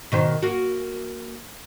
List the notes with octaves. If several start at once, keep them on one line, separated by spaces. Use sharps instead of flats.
B2 D#3 C5
A#3 F#4